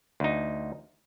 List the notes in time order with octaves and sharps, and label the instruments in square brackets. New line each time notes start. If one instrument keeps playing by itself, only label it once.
[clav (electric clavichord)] D2 D#4